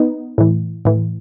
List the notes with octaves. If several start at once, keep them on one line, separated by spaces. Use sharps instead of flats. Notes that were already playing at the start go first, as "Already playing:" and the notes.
Already playing: B3 D#4
A2 E3
A2 E3